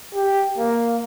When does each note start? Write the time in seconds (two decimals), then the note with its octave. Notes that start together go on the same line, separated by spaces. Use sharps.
0.15 G4
0.58 A#3